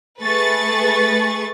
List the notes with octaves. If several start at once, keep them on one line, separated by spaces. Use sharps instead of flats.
A3 G#4 B4 A5 C#6 A6